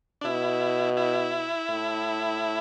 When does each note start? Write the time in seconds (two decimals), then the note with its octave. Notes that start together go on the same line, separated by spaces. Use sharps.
0.21 D4
0.25 B2 E4
0.97 E4
1.70 A2